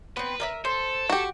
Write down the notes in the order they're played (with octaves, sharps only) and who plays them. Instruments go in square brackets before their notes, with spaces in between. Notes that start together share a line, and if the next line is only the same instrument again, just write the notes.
[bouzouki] B3 C4 [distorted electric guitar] B4
[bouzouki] A#4 D#5 E5
[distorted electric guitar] A4 [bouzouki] C5
[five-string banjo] F#4 G4